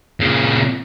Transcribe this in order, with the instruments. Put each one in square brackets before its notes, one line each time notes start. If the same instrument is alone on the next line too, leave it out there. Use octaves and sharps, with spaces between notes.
[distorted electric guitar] A#2 C#3